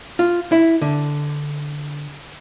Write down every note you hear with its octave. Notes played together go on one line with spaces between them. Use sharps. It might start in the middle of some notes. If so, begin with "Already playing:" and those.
F4
E4
D3